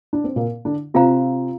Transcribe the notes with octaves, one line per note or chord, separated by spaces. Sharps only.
D4
C4
A#2 A#3
D3 D4
C3 C4 F4 C5 F5 A#5